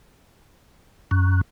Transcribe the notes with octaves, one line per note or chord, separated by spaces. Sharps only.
F#2